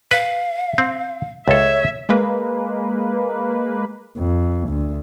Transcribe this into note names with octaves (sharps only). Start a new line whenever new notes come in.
B4 F5
C4
C#2 A4 C#5 E5
G#3 A#3 B4
F2
D2